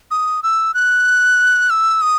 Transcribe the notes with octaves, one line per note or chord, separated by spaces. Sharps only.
D#6
E6
F#6
E6
D#6